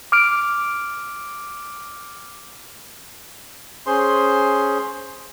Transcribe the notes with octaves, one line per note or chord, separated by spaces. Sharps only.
D6 F6 D7
C#4 G#4 C5 C6